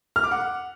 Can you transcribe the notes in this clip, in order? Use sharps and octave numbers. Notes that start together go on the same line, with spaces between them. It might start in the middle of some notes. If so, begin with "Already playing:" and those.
F6
D6
F#5